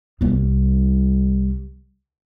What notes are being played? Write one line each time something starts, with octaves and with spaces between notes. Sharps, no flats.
C2 G3